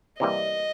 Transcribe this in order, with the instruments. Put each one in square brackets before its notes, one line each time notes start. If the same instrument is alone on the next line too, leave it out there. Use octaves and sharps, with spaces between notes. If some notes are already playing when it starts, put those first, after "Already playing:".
[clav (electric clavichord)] C3 E3 G3 A#3 [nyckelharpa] D#5